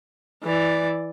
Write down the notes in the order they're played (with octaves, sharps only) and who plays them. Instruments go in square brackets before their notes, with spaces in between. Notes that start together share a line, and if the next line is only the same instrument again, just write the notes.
[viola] E3 D5